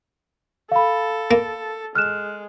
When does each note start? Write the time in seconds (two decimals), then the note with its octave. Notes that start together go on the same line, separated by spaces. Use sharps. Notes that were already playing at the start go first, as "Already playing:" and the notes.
0.72 A4 F5 B5
1.31 A#3
1.95 G#3 F6 F#6 E7